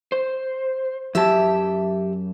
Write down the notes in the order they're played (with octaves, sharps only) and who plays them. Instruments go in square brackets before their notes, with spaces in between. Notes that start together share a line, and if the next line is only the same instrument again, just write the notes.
[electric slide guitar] C5
[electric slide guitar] F#2 A5 [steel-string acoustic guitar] G4 E5